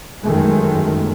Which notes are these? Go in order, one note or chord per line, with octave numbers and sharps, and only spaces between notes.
G1 F#2 D#3 G#3 A3